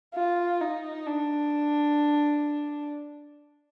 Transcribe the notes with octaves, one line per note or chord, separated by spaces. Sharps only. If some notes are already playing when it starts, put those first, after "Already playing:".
F4
D#4
D4